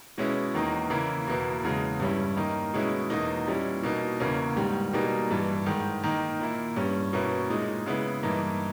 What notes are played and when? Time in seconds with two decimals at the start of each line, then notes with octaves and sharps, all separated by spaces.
0.18 B2 G#3 C#4 E4
0.54 E2 D#3 A#3 D#4
0.90 C#3 E3 A#3 E4
1.27 E2 B2 A#3 E4
1.63 E2 C#3 G#3
2.00 G2 G3 C#4 E4
2.36 D#3 A#3 D#4
2.74 B2 G#3 C#4 E4
3.10 E2 B2 A#3 D#4
3.47 A#2 G3 C#4 E4
3.83 B2 A#3 D#4
4.20 E2 C#3 E3 A#3 C#4
4.56 G#2 D#3 G3
4.93 B2 G3 A#3 D#4
5.30 G2 E3 G3
5.66 G#2 D#3 G#3
6.03 D#3 A#3 D#4
6.40 A#2 A#3 E4
6.76 G2 G3 C#4
7.13 B2 A#3 C#4 E4
7.50 A#2 G#3 D#4
7.86 C#3 G#3 B3 E4
8.23 G2 E3 A#3 D#4